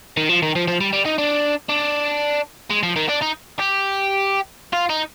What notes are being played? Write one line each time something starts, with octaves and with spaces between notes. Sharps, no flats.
D#3
F3
D#3
F3
F3
G3
G3
D#4
D4
D4
G#3
F3
D#3
D4
D#4
G4
F4
D#4